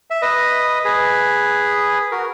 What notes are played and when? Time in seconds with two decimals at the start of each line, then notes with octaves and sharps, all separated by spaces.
0.10 E5
0.22 B4 D#5
0.85 G#4 B4
2.11 F#4 A#4